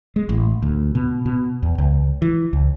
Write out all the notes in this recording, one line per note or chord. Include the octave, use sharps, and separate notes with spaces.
G#3
A1
D2
B2
B2
E2
C#2
E3
C#2